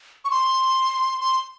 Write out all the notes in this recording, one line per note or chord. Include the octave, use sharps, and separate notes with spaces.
C#6
C6
C6